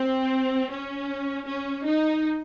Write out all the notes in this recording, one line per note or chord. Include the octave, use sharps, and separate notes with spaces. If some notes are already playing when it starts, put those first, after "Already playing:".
Already playing: C4
C#4
C#4
D#4